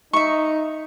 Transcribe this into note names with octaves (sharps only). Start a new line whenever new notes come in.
D#4 E5 C#6